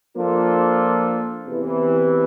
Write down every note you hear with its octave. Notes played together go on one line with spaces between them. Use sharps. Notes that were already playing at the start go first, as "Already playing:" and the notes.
F3 A#3 D4 F4 A4
E2 C3 E3